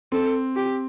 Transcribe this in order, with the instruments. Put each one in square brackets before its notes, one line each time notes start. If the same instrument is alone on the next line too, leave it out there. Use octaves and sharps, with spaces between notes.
[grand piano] C4 [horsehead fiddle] A4
[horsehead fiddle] G4